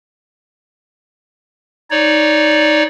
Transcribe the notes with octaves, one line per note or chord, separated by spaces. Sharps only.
D#4 C#5 D5